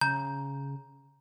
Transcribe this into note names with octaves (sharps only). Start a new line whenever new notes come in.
C#3 A#5 G6